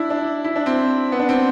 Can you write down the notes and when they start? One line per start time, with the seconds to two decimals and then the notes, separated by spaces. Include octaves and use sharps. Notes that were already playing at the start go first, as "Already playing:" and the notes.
Already playing: D4 E4
0.10 D4
0.44 E4
0.56 D4
0.66 C4
1.12 B3
1.20 D4
1.29 C4